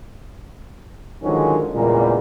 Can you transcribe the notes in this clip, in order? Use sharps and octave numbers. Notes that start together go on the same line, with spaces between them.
D3 D#3 F3 F#3 G#3 C#4
E2 A#2 C#3 G3 G#3 A#3